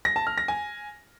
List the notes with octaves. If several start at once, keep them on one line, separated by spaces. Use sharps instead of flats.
A#6
A5
F6
A#6
G#5